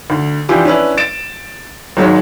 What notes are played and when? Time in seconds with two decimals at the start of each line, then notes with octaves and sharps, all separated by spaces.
0.10 D2
0.49 E3 F3 D4 E4 G4
0.65 C#4 D4 E4 B4
0.97 A6 D7 E7
1.97 G#1 F#3 G#3 C#5